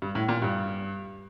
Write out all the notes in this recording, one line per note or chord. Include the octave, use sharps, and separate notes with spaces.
G2
A2
A#2
G2